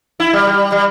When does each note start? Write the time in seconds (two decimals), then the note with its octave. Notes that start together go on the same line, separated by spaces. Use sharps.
0.20 E4
0.33 G3
0.47 G3
0.72 G3